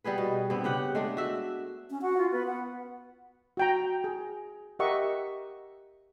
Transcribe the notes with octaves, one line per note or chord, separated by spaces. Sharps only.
G3 B3 G#4 B4
B2
G2 B3 C4
C#3 G4 F#5
G#3 A3 D4
F#4 E5
C#4
F#4 F#5
F4
B3 B4
F#5
F#4 G5 A#5
G#4
G4 A#4 D#5 E5 F#5 C#6